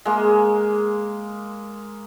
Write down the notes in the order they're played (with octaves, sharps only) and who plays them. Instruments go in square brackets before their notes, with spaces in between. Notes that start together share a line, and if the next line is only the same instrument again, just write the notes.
[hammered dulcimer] G#3 A#3